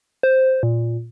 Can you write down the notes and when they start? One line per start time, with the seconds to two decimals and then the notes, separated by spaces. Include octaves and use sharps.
0.23 C5
0.63 A#2